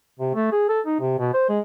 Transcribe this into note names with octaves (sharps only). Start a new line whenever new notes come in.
C3
A3
G#4
A4
D#4
C3
B2
C5
G#3